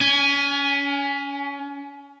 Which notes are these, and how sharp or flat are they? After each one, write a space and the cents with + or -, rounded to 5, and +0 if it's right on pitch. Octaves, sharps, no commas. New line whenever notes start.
C#4 +30 G#5 +0